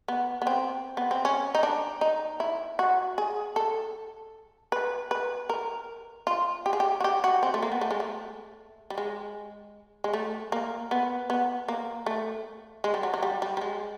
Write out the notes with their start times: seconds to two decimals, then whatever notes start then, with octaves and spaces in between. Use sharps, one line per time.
0.08 B3
0.42 B3
0.47 C4
0.97 B3
1.11 C4
1.25 C#4
1.55 D#4
1.63 D4
2.01 D#4
2.40 E4
2.79 F#4
3.18 G#4
3.56 A4
4.72 B4
5.11 B4
5.49 A#4
6.27 F4
6.66 G4
6.73 G#4
6.80 G4
7.00 F#4
7.04 G4
7.24 F#4
7.43 C4
7.54 A3
7.63 A#3
7.72 B3
7.81 A3
7.91 G#3
8.00 A3
8.90 G3
8.98 G#3
10.04 G#3
10.13 A3
10.52 A#3
10.91 B3
11.30 B3
11.68 A#3
12.06 A3
12.84 G#3
12.94 G3
13.03 F#3
13.14 F#3
13.23 G3
13.42 G3
13.57 G3
13.61 G#3